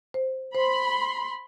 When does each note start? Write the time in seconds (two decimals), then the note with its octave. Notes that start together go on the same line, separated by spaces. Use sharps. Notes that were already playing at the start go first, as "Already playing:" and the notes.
0.14 C5
0.55 C5 B5 C6